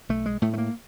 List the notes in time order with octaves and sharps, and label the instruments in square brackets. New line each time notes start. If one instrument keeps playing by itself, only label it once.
[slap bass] B1 A3
G#3
A2 A3
A3
A#3